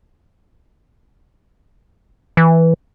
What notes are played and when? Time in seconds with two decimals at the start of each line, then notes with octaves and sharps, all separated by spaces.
2.37 E3